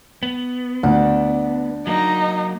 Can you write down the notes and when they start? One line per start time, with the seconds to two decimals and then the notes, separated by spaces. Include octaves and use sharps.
0.23 B3
0.83 D2 D4
1.87 F#3 A#3 D#4